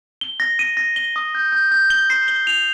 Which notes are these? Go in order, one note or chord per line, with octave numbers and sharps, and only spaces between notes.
G7
A#6
D#7
A#6
G7
D#6
G6
G6
G6
G7
C7
G7
F7